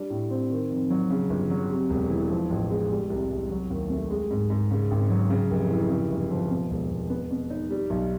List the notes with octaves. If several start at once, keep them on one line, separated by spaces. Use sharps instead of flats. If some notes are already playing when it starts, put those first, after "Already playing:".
Already playing: G3 D4
A2
C4
D#3
F2
F#3
C#3
G1
F#3
C3
E1
E3
F3
A1
G#3
G3
C2
C2
F#3
D#2
A3
G#3
G#2
G#2
C#3
G#1
F#3
C#3
F1
E3
C#3
G1
F3
B2
E1
E1
B3
B2
D#4
G3
B1